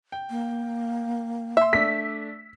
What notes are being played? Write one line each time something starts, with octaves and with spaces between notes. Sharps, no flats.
G5
A#3
E5 C6 E6
A3 D4 B6